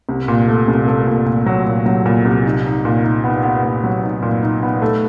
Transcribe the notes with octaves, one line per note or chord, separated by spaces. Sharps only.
C2
A#2
A3
C2
A3
A#2
A#2
F#3
A#2
F#3
A#2
C2
D#4
D#4
A#2
D#4
B3
B3
A#2
F#3
D#4
A#2
D#4
B3
A3